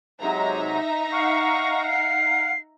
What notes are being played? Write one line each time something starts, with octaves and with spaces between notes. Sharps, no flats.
C3 F#3 G#3 D#4 E5 A#5
F5 F#5 C#6
C7